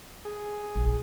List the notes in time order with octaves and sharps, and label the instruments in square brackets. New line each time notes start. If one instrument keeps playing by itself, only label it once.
[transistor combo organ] G#4
[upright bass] A#1